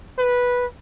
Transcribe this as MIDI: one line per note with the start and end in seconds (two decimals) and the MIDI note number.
0.19 0.65 71